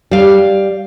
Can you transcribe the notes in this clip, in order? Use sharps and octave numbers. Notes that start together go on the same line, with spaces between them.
G3 F5